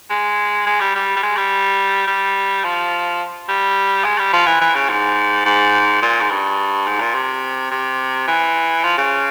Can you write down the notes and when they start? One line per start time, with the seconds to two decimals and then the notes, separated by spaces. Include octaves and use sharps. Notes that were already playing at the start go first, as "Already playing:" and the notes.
0.10 G#3
0.67 G#3
0.80 G3
0.95 G3
1.16 G3
1.23 G#3
1.37 G3
2.07 G3
2.64 F3
3.49 G3
4.04 G#3
4.19 G3
4.33 F3
4.46 E3
4.61 E3
4.75 C#3
4.89 G#2
5.46 G#2
6.02 A#2
6.21 G#2
6.30 G2
6.87 G#2
7.00 A#2
7.14 C3
7.71 C3
8.27 E3
8.84 F3
8.98 C#3